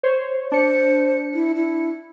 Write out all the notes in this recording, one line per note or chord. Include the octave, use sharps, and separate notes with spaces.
C5 C#5
D4 C5 C#7
E4
E4